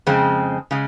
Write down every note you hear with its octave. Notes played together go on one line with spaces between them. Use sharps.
F2 C#3 G#3 C4
C#3 G#3